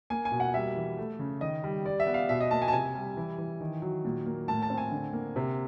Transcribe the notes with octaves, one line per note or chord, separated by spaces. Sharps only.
A#3 G#5
G#5
B2
F#5
G3 E5
E3
A3
C#3
D#3 D#5
G3
G3 D5
E5
B3
F5
B2 E5
D#5
A#3 A5
G#5
A5
C3 G#5
G3
E3
E3
D#3
F#3
A#2
A#3
A2 A5
A5
C4
G#5
D3
A#3
C3